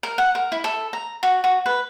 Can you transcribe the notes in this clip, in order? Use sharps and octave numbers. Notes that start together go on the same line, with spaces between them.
A#4
F#5
A#4
E4
A4
A#5
F#4
F#4
B4